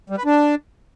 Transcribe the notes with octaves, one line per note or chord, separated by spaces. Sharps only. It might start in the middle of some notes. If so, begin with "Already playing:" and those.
G3
B4
D4